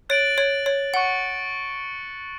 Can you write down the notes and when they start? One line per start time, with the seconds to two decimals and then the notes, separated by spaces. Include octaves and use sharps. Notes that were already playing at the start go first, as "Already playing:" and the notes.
0.09 C#5 F#6 A6 D7 F#7
0.38 C#5
0.66 C#5
0.94 F#5 C#6 F#6 C#7 G7